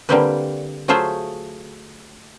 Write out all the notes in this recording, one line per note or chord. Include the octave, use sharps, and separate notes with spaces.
D3 G3 A#3 C4 G4 B4
F#3 A3 F4 G#4 C5 E5